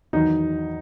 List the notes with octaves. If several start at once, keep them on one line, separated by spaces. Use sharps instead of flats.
E2 D#3 F#3 B3 D#4